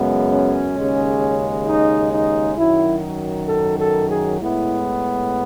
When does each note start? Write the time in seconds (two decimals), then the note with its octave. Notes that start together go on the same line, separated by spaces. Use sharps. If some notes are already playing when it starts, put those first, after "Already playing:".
Already playing: F#2 C#3 G#3 B3
0.28 C#4
0.74 D#2 C#3 G#3
1.66 D#4
2.12 D#4
2.57 F#2 D#3 F#3 E4
3.48 A4
3.79 A4
4.10 G#4
4.39 A2 G#3 B3 E4